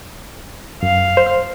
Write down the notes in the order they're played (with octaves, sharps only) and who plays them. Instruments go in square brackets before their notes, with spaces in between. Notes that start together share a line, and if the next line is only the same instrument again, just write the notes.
[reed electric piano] F#2 [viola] F5
[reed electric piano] C5